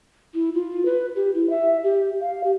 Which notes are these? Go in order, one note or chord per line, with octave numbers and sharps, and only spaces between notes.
E4
F4
B4
G4
E4
E5
G4
F5
G4